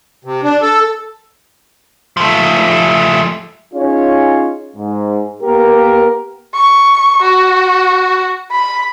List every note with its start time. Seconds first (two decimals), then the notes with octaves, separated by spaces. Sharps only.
0.25 C3
0.43 D4
0.62 A4
2.17 F3 A3
3.74 C#4 D#4 F4 G#4 C#5
4.76 G#2
5.43 A#3 B3 G4 A#4
6.54 C#6
7.22 F#4
8.51 B5